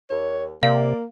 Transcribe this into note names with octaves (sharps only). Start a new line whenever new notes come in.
D#2 C#5
C3 A#3 D5 F5